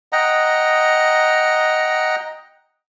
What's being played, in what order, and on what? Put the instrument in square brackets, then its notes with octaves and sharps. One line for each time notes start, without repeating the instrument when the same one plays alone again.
[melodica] D#5 F#5 G5 A#5